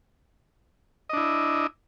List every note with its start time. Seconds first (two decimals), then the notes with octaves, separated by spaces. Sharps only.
1.09 D#5
1.13 D4
1.17 E4